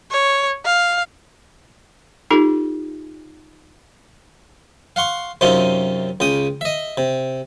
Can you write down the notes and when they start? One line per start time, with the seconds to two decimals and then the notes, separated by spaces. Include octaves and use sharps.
0.11 C#5
0.65 F5
2.31 D#4 F4 G4 A4
4.96 F5 F#5 C6 C#6
5.41 F#2 C3 C4 C#4 D#4 F4
6.20 C#2 C#3 G5 D#6
6.61 D#5 E5
6.97 C3